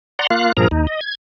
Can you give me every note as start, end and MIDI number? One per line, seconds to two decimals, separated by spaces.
0.19 0.27 74
0.19 0.27 78
0.19 0.27 82
0.19 0.27 84
0.30 0.52 58
0.30 0.52 65
0.30 0.52 77
0.30 0.52 90
0.57 0.68 43
0.57 0.68 46
0.57 0.68 53
0.57 0.68 68
0.57 0.68 70
0.57 0.68 82
0.71 0.87 39
0.71 0.87 63
0.87 1.00 75
1.01 1.15 92